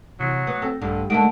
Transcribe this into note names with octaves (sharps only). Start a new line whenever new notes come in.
C3 E3 F#3
B3 F#6
C4 A4 G5 A#6
A#1 G2 D3
D3 D#3 G#3 A3 F#4 A5 D7